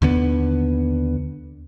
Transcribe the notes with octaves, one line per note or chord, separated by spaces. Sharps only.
D#2 D3 B3